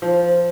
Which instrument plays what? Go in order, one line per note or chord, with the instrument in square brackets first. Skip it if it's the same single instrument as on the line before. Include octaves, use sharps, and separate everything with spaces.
[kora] F3